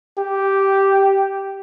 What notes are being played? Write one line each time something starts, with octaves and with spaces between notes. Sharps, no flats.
G4